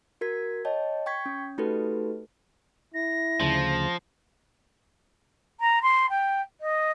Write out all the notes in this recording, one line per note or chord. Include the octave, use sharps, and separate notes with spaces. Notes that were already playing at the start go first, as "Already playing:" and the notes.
F#4 A#4 G#6 B6
C#5 D#5 G5 A5
G5 C#6 G#6 B6
C#4
A3 D#4 F#4 G4 A4 B4
E4 A#6
D2 C#3 F3
A#5
C6
G5
D#5